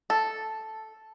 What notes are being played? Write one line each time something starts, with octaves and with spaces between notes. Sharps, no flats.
A4